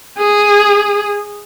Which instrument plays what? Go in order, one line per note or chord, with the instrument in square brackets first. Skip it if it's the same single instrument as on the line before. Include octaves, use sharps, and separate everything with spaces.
[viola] G#4